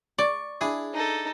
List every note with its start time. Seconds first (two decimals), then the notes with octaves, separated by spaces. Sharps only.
0.19 D5 C#6
0.61 D4 E4 G#4
0.94 D#4 A4